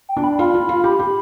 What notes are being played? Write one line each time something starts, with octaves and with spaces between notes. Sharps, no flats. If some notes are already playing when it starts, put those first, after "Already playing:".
G5
D4
B5
F4 B5
F4
F4
G4 B5
G4